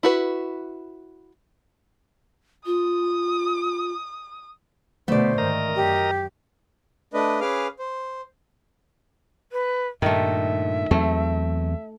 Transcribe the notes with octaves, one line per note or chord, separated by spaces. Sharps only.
E4 F#4 B4
F4 D#6
B2 D3 A3 B3 C5 D5
G#2 D#3 A#4 D#5 A#5
F#2 G4
A3 D4 B4 D#5
C#4 G#4 B4 F5 D6 F6
C5
B4
G2 A#2 D#3 A3 E5
E2 F#3 A3 C4